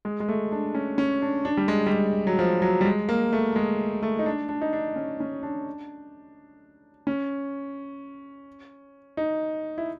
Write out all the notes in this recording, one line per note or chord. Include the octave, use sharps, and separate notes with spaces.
G#3
G#3
A3
D4
C#4
C#4
D4
D4
G3
G#3
G3
G#3
F#3
F3
F#3
G3
G#3
A#3
A3
G#3
A3
D#4
D4
D4
D#4
D4
C#4
C#4
D4
C#4
D#4
E4